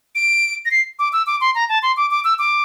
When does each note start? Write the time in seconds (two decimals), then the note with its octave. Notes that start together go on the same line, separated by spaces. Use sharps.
0.15 D7
0.65 A#6
0.71 C7
0.99 D6
1.13 E6
1.27 D6
1.41 C6
1.55 A#5
1.69 A5
1.82 C6
1.97 D6
2.11 D6
2.25 E6
2.39 D6